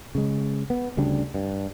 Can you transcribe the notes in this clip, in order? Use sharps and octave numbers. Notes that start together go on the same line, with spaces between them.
C#3 G#3
B3
D2 C#3 G3 D4
G2